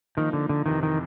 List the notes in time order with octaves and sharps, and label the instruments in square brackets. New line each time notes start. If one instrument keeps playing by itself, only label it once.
[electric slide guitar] D#3 [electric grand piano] F3 A#3 D#4
[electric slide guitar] D3
D3
[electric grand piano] F2 C3 E3 [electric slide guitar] D#3
[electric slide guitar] D#3